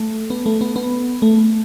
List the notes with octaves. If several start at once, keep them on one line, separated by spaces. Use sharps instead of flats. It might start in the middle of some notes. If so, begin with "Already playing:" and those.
Already playing: A3
B3
A3
B3
B3
A3